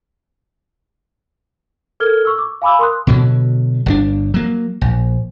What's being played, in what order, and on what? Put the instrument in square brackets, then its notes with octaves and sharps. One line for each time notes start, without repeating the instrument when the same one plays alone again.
[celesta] A4 A#4 F6 G#6 G7
C#6 E6
D6
F5 G#5 B5 D6 E6
A#4 C6 D#6 F#6
[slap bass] B2 D3 F#3
G1 D3 D4
F#3 A#3
A#1